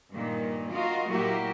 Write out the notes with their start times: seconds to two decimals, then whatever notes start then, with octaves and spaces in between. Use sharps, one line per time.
0.12 G2 A#2 D#3 A#3
0.72 F4 F#4 A#4 D#5 F5
1.09 A#2 F#3 A#3 E4 F#4 G4